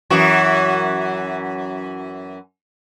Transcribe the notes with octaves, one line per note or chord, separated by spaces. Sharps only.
F#2 E3 F#4